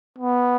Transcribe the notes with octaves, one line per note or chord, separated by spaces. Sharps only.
B3